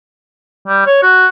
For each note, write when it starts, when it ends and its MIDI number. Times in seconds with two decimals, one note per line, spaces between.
0.68 0.82 55
0.86 0.97 73
1.03 1.27 66